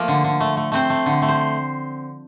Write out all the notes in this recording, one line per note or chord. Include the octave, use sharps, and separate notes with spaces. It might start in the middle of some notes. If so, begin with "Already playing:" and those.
Already playing: F3 A3 A#3 A#4
D3
D3
A3
A3
A3 C4 C5
A3
D3
A3
C5